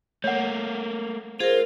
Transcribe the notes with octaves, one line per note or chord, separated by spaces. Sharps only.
A3 A#3 C#5 F#5
F4 G#4 A#4 C5